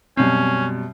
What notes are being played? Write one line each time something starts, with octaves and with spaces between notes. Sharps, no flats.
F#2 B2 G3 C4 C#4